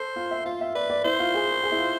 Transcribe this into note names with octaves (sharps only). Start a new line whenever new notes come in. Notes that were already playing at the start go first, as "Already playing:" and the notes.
Already playing: A4 C5
F4
E5
F4 F5
E5
B4 D5
D5
E4 C5
F4
G#4
G#4
E4
F4